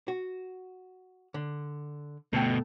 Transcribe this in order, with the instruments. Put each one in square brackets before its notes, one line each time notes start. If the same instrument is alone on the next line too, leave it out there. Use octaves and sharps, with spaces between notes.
[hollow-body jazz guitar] F#4
D3
[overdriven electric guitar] D2 B2 [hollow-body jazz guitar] A3 A4 G5